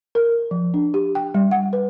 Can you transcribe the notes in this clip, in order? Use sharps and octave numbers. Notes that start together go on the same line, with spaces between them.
A#4
F3
D4
G4
G5
G3
F#5
B4